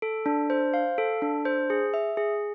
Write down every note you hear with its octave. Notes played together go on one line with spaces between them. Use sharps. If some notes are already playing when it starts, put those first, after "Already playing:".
A4
D4
C5
F5
A4
D4
C5
G#4
E5
G#4